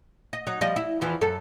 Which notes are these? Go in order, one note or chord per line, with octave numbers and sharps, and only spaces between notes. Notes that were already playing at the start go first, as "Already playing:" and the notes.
D#5
F#3 D#4
F3 G3 D#5
E4
E2 E3 F3
F#2 A4